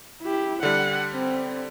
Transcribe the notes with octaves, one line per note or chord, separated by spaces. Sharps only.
E4 G4
D3 G3 F#5
C4